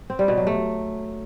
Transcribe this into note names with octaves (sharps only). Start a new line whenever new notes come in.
C4
G3
B2
F#3
A3